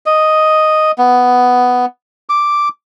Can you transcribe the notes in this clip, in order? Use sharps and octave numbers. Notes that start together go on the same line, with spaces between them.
D#5
B3
D6